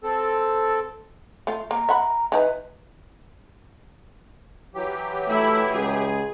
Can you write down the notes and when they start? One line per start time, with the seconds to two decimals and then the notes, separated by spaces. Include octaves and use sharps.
0.03 C4 A4
1.47 A3 F4
1.71 A#3 A#5
1.89 E5 F#5 B5
2.32 E3 D#4 B4 A#5
4.75 E3 F#3 G4
5.29 A3 E4
5.73 C#2 G#4